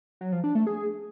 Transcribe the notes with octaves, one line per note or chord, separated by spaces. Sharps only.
F#3
F3
D4
A3
G#4